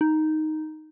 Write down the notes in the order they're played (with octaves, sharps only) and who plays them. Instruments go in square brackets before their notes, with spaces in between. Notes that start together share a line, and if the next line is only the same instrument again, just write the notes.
[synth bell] D#4